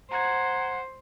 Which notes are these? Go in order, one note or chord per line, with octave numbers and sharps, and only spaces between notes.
C5 F#5 A#5 G#6